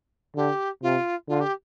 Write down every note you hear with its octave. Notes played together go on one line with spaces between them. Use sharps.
D3 G4
C3 F4
D3 F4
G4